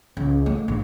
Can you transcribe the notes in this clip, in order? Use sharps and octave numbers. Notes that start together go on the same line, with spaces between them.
C#2
A3
A#1